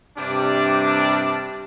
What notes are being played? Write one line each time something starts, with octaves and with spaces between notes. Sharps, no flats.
G2 C3 G3 D4